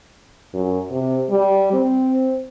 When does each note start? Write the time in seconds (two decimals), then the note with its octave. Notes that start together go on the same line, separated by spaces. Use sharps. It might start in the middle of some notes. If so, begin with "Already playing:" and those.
0.54 F#2
0.91 C3
1.30 G3
1.73 C4